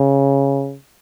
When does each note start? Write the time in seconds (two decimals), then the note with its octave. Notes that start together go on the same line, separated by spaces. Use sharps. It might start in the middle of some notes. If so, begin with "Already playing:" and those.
Already playing: C#3